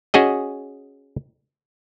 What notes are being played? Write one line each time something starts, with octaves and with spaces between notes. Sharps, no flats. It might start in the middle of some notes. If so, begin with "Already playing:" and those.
C#4 F#4 G#4 D#5